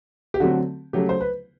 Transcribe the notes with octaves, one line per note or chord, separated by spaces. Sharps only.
G4
D3 F#3 A3 C4 F#4
C#3 F#3 A3 G4
C5
B4